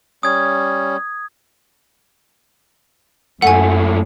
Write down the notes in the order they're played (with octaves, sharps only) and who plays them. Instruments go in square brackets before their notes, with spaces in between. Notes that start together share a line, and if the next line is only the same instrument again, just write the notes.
[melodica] G3 C#4 [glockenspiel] D#6 G#6
[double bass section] F#2 [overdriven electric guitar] A#2 A3 [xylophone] F#5 G#5